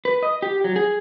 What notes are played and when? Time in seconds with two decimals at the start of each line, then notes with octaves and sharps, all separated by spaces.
0.05 B4
0.23 D#5
0.42 G4
0.64 F#3
0.76 G#4